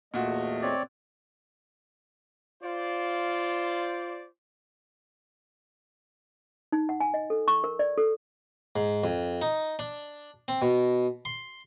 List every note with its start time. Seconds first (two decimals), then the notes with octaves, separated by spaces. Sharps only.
0.14 E2 A#2 A3 F#4 D#5
0.62 C4 C#5 D5
2.63 F4 C5 D5
6.72 D#4
6.89 F#5
7.00 G#5
7.14 D#5
7.30 A4
7.48 C#6
7.64 A#4
7.79 D5
7.98 A4
8.76 G#2
9.04 F2
9.42 D#4
9.79 D4
10.48 C4
10.62 B2
11.25 C6